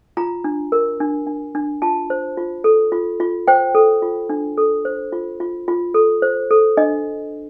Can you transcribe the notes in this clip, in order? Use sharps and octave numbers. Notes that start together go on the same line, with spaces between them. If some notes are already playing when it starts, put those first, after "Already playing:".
F4 A#5
D4
A#4
D4
D4
D4
F4 A5
C5
F4
A4
F4
F4
C5 G5
A4
F4
D4
A4
C5
F4
F4
F4
A4
C5
A4
D4 D#5